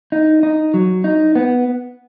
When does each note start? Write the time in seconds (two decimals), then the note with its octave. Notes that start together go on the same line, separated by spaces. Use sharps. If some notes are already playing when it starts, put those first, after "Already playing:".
0.12 D#4
0.43 D#4
0.74 F#3
1.04 D#4
1.35 B3